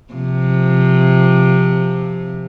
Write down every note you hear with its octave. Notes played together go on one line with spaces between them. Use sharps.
C3 F3